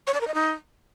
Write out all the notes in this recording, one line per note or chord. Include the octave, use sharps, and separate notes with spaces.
C#5
D5
A#4
D#5
D#4